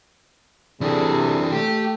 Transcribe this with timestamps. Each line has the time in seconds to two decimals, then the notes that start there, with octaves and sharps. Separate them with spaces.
0.81 C3 E3 G3 D4 G#4 A4
1.52 A3 G4